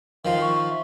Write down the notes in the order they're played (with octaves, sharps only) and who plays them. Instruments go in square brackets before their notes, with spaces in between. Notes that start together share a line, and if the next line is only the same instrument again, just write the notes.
[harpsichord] D#3 F3 F4 [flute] F5
[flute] C#6
E5